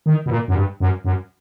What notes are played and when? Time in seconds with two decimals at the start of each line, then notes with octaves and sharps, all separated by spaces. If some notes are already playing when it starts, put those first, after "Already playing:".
0.06 D#3
0.26 B2
0.30 A#2
0.48 F#2
0.55 G2
0.80 F#2
1.04 F#2